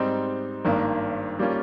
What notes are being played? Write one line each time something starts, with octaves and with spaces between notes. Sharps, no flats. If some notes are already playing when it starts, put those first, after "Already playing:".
Already playing: G#2 G3 C4 D#4
G#1 G2 D#3 A#3
G3 A#3 C#4 F4